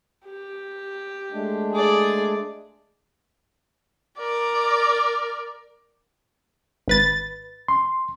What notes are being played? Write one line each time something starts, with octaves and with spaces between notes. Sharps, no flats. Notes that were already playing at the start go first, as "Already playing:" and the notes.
G4
G#3 A3 D4
G#4 D5
A#4 D5
G#1 B4 A6
C6